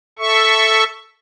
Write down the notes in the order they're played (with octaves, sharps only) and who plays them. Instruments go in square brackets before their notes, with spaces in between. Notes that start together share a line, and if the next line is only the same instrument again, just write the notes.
[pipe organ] A4 E5 C#6